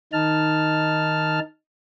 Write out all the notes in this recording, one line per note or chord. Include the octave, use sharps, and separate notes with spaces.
D#3 D#4 A5 F6